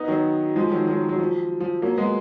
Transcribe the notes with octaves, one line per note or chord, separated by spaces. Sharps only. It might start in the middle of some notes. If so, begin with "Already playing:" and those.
Already playing: B3 D#4
D#3 F#3
F3 G#3
D#3 F#3
D#3 F#3
F#3
F3
F3
F#3 A#3
G#3 B3